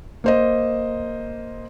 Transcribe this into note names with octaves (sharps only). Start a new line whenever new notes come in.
A#3 C5 D#5